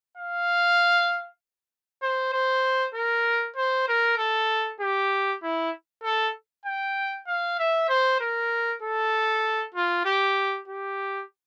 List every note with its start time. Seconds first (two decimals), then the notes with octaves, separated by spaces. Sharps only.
0.17 F5
2.02 C5
2.33 C5
2.94 A#4
3.56 C5
3.88 A#4
4.18 A4
4.80 G4
5.42 E4
6.03 A4
6.66 G5
7.27 F5
7.59 E5
7.89 C5
8.20 A#4
8.82 A4
9.74 F4
10.05 G4
10.68 G4